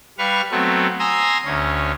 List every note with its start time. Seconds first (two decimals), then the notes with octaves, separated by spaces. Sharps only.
0.18 G3 B4 F5 C#6 F6
0.51 F#3 A3 B3 C4
0.99 G#5 A#5 C6 D#6 E6
1.45 D2 C#4